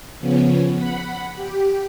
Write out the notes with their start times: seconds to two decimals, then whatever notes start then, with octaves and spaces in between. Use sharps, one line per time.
0.20 C#3 F3 B3 C#4
0.75 F#5 B5
1.35 G4